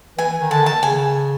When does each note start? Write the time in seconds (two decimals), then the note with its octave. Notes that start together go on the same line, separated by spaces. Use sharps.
0.18 E3 G#5
0.40 D#3
0.51 D3 A5
0.62 D#3 A5
0.83 C#3 G#5